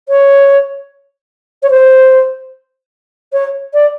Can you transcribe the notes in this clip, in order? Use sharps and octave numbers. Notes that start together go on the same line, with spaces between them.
C#5
C#5
C5
C#5
D5